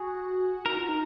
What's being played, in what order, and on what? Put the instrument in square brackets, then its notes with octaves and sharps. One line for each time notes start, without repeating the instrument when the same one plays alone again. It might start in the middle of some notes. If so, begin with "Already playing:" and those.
Already playing: [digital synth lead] F#4 [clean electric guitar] G#4
[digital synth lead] D#4 [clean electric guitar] A#4
[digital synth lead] F4
D#4